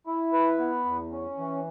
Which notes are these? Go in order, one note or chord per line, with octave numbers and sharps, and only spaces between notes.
E4
B4
B3
E2
C#4
E3